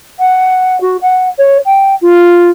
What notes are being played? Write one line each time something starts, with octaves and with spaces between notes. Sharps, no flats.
F#5
F#4
F#5
C#5
G5
F4